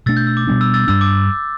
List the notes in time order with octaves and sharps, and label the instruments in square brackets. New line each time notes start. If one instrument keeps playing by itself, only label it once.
[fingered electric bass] B2 A3 D4 [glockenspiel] E6 A6
[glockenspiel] G6
E6
D6
[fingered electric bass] B2 G3 B3 D4
[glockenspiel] E6
E6 A6
[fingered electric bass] G2 G3 D4 [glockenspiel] E6
[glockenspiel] D6